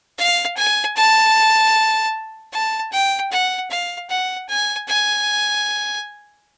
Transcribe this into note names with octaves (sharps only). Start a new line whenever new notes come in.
F5
G#5
A5
A5
G5
F#5
F5
F#5
G#5
G#5